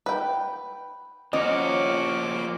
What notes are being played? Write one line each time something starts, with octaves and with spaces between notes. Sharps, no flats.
B4 G5
F3 A#3 C#4 F#4 D#5 D6